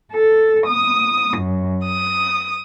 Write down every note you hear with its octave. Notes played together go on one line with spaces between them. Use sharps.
A4
D#6
F#2
D#6